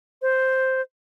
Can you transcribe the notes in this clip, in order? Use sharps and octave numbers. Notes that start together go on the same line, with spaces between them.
C5